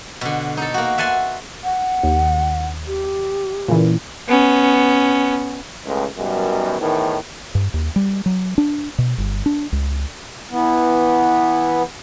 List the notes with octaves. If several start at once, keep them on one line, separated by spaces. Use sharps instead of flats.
B2 D3
D#4 A4
A#3 F#4
E5 F#5 G#5 A5 C6
F#5
D#2
G4
A#2 C#3 E3
B3 C#4
C#2 A2
F#2 B2 D#3 F#3 G3
E2 A2 D#3
G2
D#2
G3
F#3
D4
B2
G1
D4
C#2
E3 B3